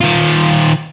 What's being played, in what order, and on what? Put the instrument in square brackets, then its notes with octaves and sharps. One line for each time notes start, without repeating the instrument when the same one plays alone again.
[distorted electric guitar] D#3 F4